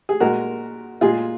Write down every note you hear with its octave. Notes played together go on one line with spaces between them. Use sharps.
G#4
A#2 G#3 F#4 A#4
A#2 G#3 F4 G#4